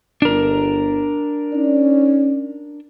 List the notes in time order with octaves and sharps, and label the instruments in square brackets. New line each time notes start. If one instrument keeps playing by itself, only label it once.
[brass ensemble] G1 [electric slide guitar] D4 A#4
[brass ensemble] C#4 D#4 D5